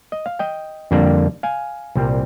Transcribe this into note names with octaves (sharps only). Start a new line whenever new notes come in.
D#5
F5
D#5 G5
F2 D3 G3 A#3 D4
F5 G#5
C2 A#2 G3 C4